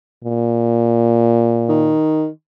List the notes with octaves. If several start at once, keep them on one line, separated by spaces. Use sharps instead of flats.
A#2
D#3